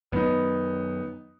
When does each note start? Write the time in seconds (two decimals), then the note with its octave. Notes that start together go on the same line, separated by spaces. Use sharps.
0.12 F#2 D#3 F#3 B3 D#4